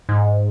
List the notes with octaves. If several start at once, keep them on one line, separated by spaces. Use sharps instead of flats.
G#2